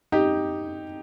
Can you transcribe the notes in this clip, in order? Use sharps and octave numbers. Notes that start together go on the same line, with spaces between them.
D#4 G4